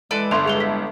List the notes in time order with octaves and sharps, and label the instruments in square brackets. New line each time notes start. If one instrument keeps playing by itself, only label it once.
[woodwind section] E3 G#3 [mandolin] A4 B4 D5
[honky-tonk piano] G1 [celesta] E5 C6 F7
[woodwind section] A2 G3 G#3 [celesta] G#4 F7 G7
[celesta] B6